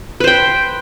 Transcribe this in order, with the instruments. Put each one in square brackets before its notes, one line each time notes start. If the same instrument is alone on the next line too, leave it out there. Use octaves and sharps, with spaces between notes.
[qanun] B4
C5
G5